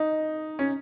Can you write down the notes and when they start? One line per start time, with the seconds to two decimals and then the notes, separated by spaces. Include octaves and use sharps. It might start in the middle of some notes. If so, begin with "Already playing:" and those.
Already playing: D#4
0.59 C#4